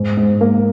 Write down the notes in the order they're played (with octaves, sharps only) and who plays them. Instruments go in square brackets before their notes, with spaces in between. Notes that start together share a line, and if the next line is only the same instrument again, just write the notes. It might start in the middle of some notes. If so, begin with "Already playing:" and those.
Already playing: [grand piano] G#2
G#2
A#3